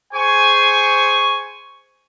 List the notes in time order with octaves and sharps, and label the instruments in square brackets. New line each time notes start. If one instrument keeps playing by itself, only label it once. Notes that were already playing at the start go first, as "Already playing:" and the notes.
[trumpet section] G#4 C5 G#5 C#6